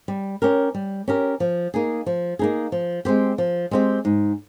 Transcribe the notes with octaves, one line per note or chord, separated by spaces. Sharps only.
G3
C#4 G4 A#4
G3
C#4 G4 A#4
F3
A#3 D#4 G#4
F3
A#3 D#4 G#4
F3
G#3 C4 G4
F3
G#3 C4 G4
G#2